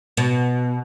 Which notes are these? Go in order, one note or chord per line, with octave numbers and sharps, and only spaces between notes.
B2